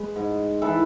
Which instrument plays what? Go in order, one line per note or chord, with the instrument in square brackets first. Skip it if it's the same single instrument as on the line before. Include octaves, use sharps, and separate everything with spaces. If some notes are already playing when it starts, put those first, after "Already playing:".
Already playing: [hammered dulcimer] G#3 B4
G#2
E3 A4 B4